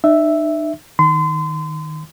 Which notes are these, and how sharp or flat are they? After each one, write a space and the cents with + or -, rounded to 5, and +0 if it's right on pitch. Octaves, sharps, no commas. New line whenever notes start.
D#4 -40 E5 +0
D#3 +0 C6 -35